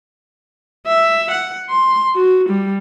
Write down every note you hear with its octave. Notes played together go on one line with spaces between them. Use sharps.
E5
F#5
C6
F#4
G3